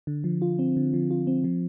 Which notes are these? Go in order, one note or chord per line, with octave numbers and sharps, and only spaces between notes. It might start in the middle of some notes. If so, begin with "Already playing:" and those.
D3
F3
F4
C4
D3
F3
F4
C4
F3